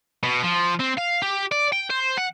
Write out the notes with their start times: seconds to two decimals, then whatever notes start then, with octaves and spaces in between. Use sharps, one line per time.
0.23 B2
0.44 F3
0.80 C4
0.98 F5
1.22 G4
1.52 D5
1.72 G5
1.90 C5
2.18 F#5